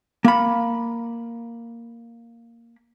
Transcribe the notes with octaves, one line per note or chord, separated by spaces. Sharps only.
A#3 B5